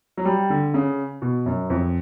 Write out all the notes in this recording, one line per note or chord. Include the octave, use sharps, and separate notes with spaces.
F#3
G3
D3
C#3
B2
F#2
F2